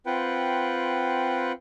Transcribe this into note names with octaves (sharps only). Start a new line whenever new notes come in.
C4 F4 B4 F#5 G5